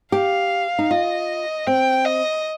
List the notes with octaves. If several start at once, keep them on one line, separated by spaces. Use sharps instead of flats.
G4 F5
D#4
F4 D#5
C4 G5
D#5